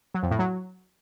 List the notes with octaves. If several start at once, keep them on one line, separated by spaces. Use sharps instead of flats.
F#3
F2
A2
F#3